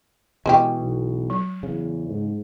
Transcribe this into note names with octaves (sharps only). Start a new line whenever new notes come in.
B2 E3 G#3 C#4 G4
B1
F#3
E2 C#3
G#2